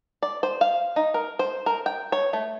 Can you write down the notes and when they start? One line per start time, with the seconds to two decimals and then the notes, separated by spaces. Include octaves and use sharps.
0.22 D5
0.43 C5
0.61 F5
0.96 D#4
1.14 A#4
1.39 C5
1.66 A#4
1.86 G5
2.12 C#5
2.33 A3